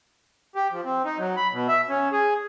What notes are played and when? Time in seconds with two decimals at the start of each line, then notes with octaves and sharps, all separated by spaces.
0.55 G4
0.72 F3
0.85 C4
1.05 D#4
1.18 F#3
1.37 B5
1.52 B2
1.68 E5
1.89 C#4
2.12 G#4